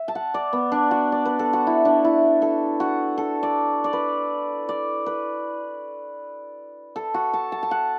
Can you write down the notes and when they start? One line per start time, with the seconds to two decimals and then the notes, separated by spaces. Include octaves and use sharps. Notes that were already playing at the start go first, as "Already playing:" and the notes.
Already playing: E5
0.08 A5
0.15 F#5
0.34 D5
0.53 B3
0.72 D4
0.91 F#4
1.12 D5
1.25 B4
1.39 A4
1.53 F#4
1.67 E4
1.85 D4
2.05 E4
2.42 A4
2.80 F#4
3.18 A4
3.43 D5
3.84 D5
3.93 B4
4.69 D5
5.06 B4
6.96 A4
7.14 F#4
7.33 A5
7.52 A5
7.63 A5
7.71 F#5